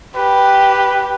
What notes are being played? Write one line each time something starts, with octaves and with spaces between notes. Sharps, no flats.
G4 B4